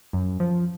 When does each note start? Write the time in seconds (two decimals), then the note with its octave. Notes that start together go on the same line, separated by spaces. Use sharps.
0.13 F#2
0.40 F3